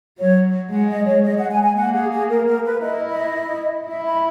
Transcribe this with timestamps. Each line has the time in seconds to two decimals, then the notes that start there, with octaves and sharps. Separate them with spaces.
0.18 F#3 C#5
0.71 G#3 F#5
0.89 D#5
1.06 C#5
1.24 G#3 D#5
1.37 F#5
1.50 G#5
1.63 G#5
1.77 A#3 F#5
1.94 G#4
2.12 G#4
2.29 A#4
2.46 A#4
2.65 B4
2.82 E4 D#5
3.09 D#5
3.88 E4 E5
4.05 B5